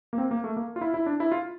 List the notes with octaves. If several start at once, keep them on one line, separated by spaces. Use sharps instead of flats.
A#3
C4
A#3
A3
A#3
F4
E4
E4
D4
E4
F4